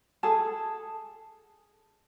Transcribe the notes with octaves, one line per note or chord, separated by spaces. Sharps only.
G#4 A4 A5